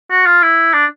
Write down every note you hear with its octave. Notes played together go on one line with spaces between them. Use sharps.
F#4
F4
E4
D4